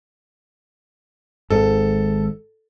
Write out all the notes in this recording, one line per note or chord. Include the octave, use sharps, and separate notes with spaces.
G#1 G#2 D#3 A4